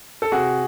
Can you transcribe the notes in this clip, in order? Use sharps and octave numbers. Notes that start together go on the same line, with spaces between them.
A4
C3 F#4 G#4